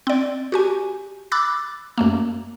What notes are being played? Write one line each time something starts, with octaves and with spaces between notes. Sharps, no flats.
C4 D5
F#4 G4 G#5
B5 D6 E6 F#6 A6
F#2 A3 A#3